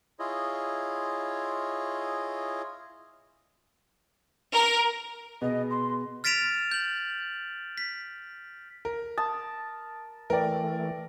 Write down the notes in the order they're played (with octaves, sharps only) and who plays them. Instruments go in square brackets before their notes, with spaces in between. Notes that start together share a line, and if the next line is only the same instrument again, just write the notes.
[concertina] E4 F4 G#4 C#5 D#5
[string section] A#4
[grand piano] B2 B3 G#4 [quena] D#5
[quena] C6
[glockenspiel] F6 A6 B6 D7 E7 F7
G6 F#7
B6
[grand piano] A#4
[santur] A5 [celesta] D#6
[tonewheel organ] E3 A3 [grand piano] A#4 D5 [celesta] B4 G5